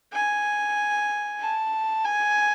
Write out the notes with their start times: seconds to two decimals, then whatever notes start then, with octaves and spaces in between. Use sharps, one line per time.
0.13 G#5
1.40 A5
2.05 G#5